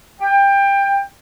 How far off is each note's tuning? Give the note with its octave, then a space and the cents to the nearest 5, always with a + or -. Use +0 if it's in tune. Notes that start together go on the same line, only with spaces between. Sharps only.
G5 +20